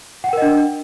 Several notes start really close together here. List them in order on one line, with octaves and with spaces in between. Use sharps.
F#5 G5 A#4 D#5 D4